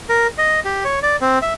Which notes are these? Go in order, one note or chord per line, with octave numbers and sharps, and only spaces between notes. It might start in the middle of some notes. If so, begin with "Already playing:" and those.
A#4
D#5
G4
C#5
D5
C4
E5